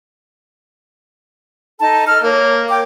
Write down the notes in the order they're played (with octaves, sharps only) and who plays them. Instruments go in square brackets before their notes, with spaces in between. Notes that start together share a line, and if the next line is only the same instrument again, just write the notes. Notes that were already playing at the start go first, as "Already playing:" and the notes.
[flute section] D#4 A4 A5
A4 D#5 F6
[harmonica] A#3 [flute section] C#5
[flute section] C#5 G5 D6